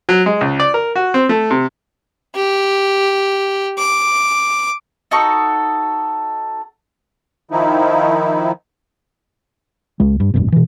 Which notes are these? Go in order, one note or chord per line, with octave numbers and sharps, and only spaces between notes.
F#3
G#3
C#2
D5
A#4
F#4
C4
A3
C3
G4
D6
D#4 F#4 A4 C#6
D#3 F3 D#4 E4
C#2 G#3
G2
E1 A1 F#2 B2
B2 E3